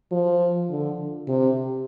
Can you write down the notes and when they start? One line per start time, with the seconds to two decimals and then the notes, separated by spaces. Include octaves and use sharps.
0.12 F3
0.69 D3
1.28 C3